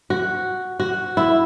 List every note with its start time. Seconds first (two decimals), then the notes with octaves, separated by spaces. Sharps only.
0.10 F#4
0.80 F#4
1.17 E4